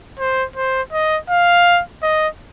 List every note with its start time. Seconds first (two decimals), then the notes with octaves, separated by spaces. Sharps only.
0.19 C5
0.56 C5
0.92 D#5
1.30 F5
2.02 D#5